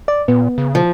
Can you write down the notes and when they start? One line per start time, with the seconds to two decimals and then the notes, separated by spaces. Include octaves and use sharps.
0.08 D5
0.28 A#2 B3
0.58 C#3
0.75 F3